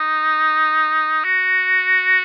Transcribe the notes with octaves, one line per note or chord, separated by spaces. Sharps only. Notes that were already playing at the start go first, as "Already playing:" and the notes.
Already playing: D#4
F#4